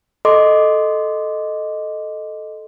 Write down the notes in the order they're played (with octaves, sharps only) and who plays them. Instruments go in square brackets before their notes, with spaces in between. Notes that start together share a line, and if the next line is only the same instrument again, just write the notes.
[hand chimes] A4 D#5 C6 D6